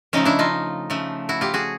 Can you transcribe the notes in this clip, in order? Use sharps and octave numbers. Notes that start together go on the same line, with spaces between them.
C#3 F3 A3 C#4 D#4
D4 E4
D#4 F4
C#3 F3 A3
E4 F#4
F4 G4
F#4 G#4